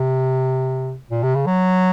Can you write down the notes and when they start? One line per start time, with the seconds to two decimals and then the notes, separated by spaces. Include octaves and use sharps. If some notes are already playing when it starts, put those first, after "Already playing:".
Already playing: C3
1.11 A#2
1.23 C3
1.35 C#3
1.46 F#3